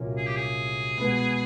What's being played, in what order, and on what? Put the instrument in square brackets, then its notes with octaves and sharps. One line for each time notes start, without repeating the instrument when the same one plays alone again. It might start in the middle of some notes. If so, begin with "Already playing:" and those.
Already playing: [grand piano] C2 A#2 F#3 A#3 C#4
[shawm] G#4
G4
G#4
[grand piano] B2 G#3 B3